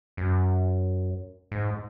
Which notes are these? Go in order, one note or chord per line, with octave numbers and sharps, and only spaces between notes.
F#2
G#2